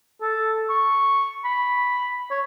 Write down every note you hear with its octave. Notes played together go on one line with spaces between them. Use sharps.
A4
C#6
B5
C#5